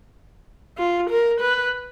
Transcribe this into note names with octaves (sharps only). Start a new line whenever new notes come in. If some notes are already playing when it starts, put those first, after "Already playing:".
F4
A#4
B4